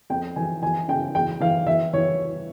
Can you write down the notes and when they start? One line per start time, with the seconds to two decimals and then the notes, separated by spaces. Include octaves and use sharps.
0.10 F2 G5
0.36 E3 G#5
0.62 E3 G#5
0.88 C#3 G5
1.15 E2 G5
1.40 E3 F5
1.66 E3 E5
1.93 E3 C#5